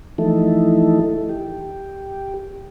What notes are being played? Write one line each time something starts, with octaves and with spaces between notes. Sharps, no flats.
E3 F3 A3 D#4 E4 A4
G4